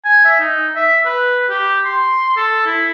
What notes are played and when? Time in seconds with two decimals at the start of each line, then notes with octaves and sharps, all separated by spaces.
0.05 G#5
0.25 E5
0.40 D#4
0.76 E5
1.05 B4
1.50 G4
1.85 C6
2.37 A4
2.66 E4